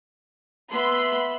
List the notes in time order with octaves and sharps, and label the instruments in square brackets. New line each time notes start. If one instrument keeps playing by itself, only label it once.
[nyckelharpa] B3 E5 [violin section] B5 C6